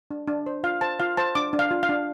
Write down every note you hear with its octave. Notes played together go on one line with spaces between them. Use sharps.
D4
D4
C5
F4 F5
C5 A5
F4 F5
C5 A5
D4 D6
D4
F5
F4
F5
D4